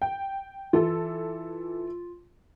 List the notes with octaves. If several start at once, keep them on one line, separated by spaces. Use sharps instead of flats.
G5
E3 F4 A4